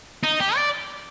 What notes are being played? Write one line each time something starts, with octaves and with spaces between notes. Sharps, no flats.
D#4
G4
D5